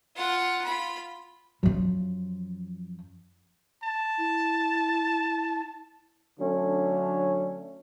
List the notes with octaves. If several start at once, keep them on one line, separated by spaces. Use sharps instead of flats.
F4 F#5
F4 B5
F#2 F3
A5
E4
D3 F#3 A3 C#4 D4